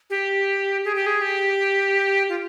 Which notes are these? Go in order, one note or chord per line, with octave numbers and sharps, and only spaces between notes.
G4
G#4
G4
G#4
G4
F4